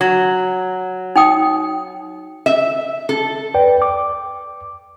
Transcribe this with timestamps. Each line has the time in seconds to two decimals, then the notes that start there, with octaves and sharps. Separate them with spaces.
0.01 F#3
1.16 D#4 G5 D#6
2.46 E5
3.09 A4
3.54 B4 D5 G5
3.82 D6